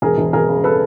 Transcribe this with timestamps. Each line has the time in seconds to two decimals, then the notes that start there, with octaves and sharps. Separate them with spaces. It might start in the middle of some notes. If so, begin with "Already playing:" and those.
0.02 E1 G#4 A#4
0.18 E1
0.33 E1 G#4 A#4
0.48 C#3
0.64 A4 B4